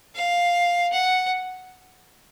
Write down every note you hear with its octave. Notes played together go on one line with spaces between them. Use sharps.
F5
F#5